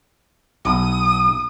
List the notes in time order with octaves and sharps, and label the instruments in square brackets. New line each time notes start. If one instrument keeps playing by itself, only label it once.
[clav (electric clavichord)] B1 [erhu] D#6